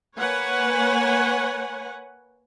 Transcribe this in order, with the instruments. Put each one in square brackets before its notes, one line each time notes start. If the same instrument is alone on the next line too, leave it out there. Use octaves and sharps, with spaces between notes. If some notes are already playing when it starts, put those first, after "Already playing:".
[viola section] A#3 B4 C#5 F#5 G#5